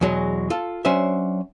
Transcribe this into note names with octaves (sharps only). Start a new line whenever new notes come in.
E2 B2 F#3 G#3
F4 A4
F#3 C#4 D4 C5 E5